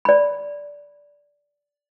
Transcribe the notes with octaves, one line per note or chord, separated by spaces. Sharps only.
D5 B5